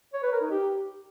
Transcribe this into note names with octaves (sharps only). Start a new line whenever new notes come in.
C#5
B4
A#4
D#4
G4